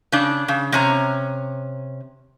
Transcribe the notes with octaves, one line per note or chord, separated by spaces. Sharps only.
C#3 D4
C#3
C3 C#4 A#5